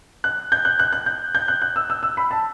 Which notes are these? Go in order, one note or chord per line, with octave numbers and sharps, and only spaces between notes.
F#6
G6
F#6
F#6
F#6
G6
G6
F#6
F#6
E6
E6
E6
B5
A5